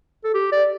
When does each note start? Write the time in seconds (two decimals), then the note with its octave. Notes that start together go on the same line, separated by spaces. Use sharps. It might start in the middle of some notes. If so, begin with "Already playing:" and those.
0.24 A4
0.34 G4
0.52 D5